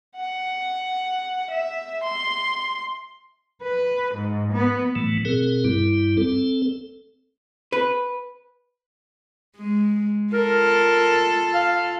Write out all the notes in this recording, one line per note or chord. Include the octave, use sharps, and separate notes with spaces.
F#5
E5
C6
B4
G#2
B3
A2 E3 F#3 A3
B2 C4 G#4 A#4
G2 G3 E4
C4 A4
B4
G#3
F4 A4 A#4
F5